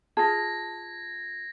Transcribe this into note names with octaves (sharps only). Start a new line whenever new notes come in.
F4 G#4 A5 G#6 A#6